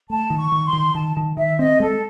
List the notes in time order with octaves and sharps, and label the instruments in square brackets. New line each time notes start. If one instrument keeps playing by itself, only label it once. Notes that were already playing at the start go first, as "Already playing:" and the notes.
[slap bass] A3 [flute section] A5
[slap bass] D#3
[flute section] C#6
[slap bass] D#3
[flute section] C6
[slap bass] D#3
[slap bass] D#3 [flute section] A5
[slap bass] D#3
[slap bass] D#3 [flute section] E5
[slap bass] C4 [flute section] D#5
[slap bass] G#3 [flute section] A4